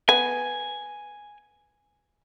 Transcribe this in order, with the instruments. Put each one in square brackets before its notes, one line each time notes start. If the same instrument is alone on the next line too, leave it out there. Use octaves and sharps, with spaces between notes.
[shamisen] B3 [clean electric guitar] G#5